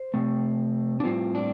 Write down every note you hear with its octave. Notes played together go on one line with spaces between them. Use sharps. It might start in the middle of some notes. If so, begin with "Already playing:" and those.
Already playing: C5
C3 A3 C4
D4
A2 G3 C4 F4
D4